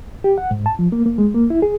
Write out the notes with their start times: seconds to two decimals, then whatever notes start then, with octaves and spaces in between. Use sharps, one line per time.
0.24 G4
0.38 F#5
0.51 G#2
0.66 A5
0.79 F3
0.92 A#3
1.06 A#3
1.18 G#3
1.34 A#3
1.50 E4
1.62 G#4